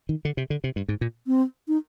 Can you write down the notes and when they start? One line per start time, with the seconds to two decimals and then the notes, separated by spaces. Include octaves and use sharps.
0.09 D#3
0.25 D3
0.37 C3
0.50 D3
0.64 C3
0.76 G2
0.88 G#2
1.01 A#2
1.27 C4
1.68 D#4